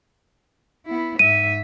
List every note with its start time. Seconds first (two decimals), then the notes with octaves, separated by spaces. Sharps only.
0.86 B3 E4
1.19 G#2 E5 D#7